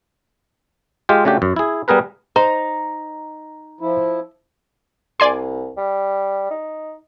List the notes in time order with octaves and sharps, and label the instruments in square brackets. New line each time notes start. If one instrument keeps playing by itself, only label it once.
[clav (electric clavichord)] G#3 F4 G4
C#3 A3 D4 F#4 G4
F#2
E4 G#4
G3 B3 G#4 A#4 B4
[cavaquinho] D#4 [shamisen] C5 [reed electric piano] A#5
[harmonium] F3 E4
[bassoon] C2 [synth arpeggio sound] D5 G#5 C6
[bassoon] G3
D#4